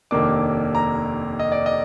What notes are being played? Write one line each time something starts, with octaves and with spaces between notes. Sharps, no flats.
F1 D#2 D#3 A#3 D4 D6
A#5
D#5
D5
D#5